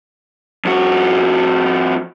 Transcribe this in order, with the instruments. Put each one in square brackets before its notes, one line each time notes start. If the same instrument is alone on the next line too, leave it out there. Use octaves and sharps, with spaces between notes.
[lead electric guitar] F2 F#4